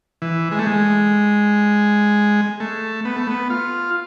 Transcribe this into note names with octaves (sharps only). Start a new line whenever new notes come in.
E3
G#3
A3
G#3
A3
B3
A3
B3
F4